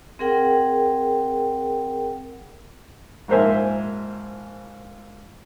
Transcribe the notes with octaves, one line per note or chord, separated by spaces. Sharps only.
C4 G#4 A#4 F#5 G5
A#1 G#2 A#4 C5 E5 G#5